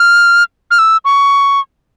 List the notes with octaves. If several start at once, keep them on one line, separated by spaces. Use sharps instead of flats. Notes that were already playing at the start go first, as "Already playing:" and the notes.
Already playing: F6
F6
E6
C#6